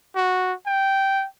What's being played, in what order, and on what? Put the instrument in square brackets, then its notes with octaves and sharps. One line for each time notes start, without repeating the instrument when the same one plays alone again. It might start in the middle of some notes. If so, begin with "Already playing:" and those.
[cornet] F#4
G5